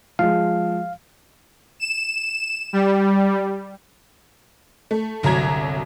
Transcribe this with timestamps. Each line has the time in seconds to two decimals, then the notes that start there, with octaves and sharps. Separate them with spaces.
0.19 F3 G#3 F5
1.80 E7
2.73 G3
4.91 A3
5.23 G1 C2 F#3 A#5 G#6